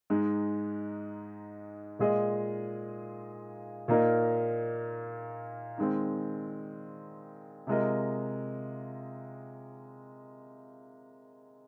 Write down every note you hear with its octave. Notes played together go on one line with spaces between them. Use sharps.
G#2 G#3 D#4
A#2 G#3 F4 G#4 D#5
A#2 A#3 D#4 A#4 D#5
D#3 G#3 C4
C3 G#3 F4 A#4 D#5